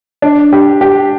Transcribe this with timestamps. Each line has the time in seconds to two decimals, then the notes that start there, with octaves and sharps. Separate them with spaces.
0.22 D4
0.53 G4
0.81 G4